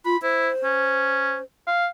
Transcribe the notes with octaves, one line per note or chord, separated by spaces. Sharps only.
F4 B5
E4 C5
C#4
F5